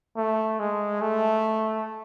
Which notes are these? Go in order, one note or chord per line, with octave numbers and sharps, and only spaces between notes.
A3
G#3
A3